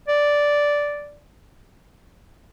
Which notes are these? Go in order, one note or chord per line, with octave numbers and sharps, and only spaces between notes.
D5